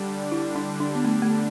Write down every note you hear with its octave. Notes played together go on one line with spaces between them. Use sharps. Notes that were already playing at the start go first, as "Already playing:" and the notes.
Already playing: D3 G3 D4
E4
D4
D4
B3
A3
A3